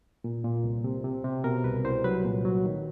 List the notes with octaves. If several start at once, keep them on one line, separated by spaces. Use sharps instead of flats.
A#2
A#2
C2
C3
C3
C3
B2 A#4
C2 B4
C2 C5
F#3 B4
A#2
F#3
D#3